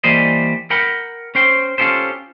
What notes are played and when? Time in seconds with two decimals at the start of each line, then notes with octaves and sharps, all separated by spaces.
0.04 E3 G3 A#3 C5 D5 D#5
0.70 A#4 F#5 G5 B5
1.35 C#4 C5 G5
1.78 C#4 F4 G4 A4 C5